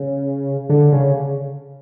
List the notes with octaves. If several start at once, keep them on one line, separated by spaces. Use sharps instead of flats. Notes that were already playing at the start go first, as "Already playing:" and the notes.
Already playing: C#3
D3
C#3